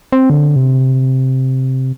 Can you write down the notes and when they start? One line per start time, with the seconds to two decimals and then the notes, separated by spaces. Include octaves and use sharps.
0.12 C4
0.30 D3
0.56 C3